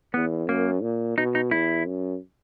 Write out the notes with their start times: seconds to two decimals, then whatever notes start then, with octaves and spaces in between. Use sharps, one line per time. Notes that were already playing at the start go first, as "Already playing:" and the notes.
0.14 E2 B3
0.48 F#2 A#3
0.82 A#2
1.18 B2 D#4
1.35 D#4
1.51 E2 E4
1.86 F#2